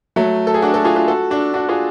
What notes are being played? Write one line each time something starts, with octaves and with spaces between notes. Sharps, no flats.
F#3 A3
A4
G#4
D4 F#4
F#4 A4
F4 G#4
F4 G#4
F#4 A4
D4 F#4
D4 F#4
F4 G#4